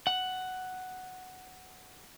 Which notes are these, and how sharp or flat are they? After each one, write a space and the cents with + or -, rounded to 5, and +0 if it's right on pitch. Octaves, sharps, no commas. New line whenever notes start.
F#5 +5